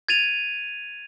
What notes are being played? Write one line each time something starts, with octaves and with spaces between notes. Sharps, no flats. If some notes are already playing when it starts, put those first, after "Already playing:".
G#6 A6 D#7 F7